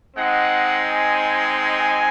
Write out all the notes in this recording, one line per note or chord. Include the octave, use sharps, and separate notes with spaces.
G#3 C4 D#4 F#5
G#5
G#5